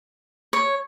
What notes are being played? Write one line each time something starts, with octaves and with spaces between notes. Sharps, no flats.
C#5